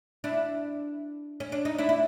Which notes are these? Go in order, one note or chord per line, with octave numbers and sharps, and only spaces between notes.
D4 E4
C#4
D4
D#4
D4 E4
E4